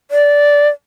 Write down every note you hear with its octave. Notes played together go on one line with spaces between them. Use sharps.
D5